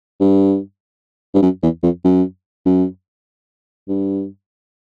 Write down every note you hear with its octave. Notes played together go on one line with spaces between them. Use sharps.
G2
G2
F#2
E2
F2
F#2
F#2
G2